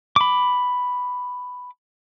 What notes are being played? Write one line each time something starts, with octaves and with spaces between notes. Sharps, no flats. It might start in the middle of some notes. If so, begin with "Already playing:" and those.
B5 D6